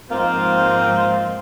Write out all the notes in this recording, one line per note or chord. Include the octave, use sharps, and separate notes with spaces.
G#2 F3 A#3 C4 D#4 F4